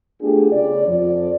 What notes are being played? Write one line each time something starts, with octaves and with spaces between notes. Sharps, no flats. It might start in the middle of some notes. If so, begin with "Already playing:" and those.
A3 B3 D4 F4 G4 G#4
C#3 D5
F2 F3 D5